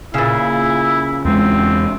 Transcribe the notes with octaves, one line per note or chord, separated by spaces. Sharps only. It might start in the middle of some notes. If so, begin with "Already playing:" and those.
A#2 C#3 E4
E2 G#3 C4